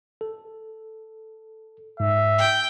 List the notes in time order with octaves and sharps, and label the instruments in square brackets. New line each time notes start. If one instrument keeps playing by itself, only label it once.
[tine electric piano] A4
[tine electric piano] G#2 [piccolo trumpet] E5
[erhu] G5